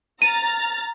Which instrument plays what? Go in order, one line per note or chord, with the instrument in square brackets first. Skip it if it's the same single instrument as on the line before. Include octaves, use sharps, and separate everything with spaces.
[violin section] A#5 F6 A6 [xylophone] D#7